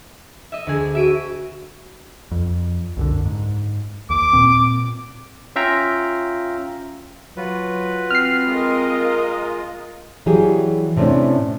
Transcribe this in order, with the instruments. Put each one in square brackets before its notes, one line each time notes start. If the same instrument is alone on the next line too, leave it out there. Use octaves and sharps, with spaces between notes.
[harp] D#5 E5
D2 G#4
[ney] F#4 [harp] E5 D7 D#7
[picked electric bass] F2
C2 F#2 D3
G#2
[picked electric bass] D#2 [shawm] D6
[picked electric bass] A#2 C4
[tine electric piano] C#4 F4 E5 F5 G5 A#5
[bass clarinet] F#3 [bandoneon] F4 F#4 B4
[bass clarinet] C4 [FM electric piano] F6 C7
[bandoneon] G#3 F4 [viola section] A#4 D#5 F5
[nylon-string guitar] E3 F#3 G3 G4 G#4
A2 C3 A3 C#4 D4